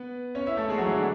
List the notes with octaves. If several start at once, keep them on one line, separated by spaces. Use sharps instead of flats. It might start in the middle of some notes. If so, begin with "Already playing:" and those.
Already playing: B3 B4
C#4 C#5
E4 E5
A3 A4
G#3 G#4
F#3 F#4
E3 E4
D3 D4